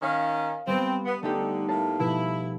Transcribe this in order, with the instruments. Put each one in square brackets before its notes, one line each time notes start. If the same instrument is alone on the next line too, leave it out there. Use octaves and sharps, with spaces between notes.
[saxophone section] D#3 C#4 [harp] F5 C#6
[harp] G3 B3 [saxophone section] C4
[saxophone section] B3
[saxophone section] D3 [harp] A3 D#4 G4
[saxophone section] A2 A#3 [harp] A5
[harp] B2 F3 [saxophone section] E4